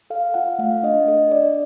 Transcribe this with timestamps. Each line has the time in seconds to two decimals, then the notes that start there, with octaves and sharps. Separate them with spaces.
0.10 A4 F5
0.34 F4 F#5
0.59 A3 F5
0.83 D4 D#5
1.08 A4 D#5
1.32 D4 D5